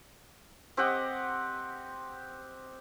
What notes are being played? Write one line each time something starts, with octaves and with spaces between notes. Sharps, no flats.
C4 G4 D#5 F#5